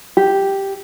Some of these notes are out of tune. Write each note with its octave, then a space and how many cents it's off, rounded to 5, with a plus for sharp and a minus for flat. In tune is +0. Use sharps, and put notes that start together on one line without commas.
G4 +0